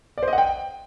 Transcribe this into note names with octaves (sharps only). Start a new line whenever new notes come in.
D5
C5
D#5
F#5
G5